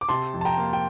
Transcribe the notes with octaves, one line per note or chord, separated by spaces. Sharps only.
D6
C3 A5 C6
F2
A5
G5 A#5
A#3
G5